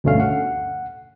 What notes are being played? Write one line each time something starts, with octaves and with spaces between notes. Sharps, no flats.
D2 G2 B2 A3 C#4 F5
F#5